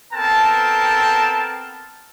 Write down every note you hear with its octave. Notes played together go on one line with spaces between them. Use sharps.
B3 C4 A4 A#4 G5 A5